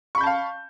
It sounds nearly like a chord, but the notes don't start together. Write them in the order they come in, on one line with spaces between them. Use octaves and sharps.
C#6 B5 G6 A5 F5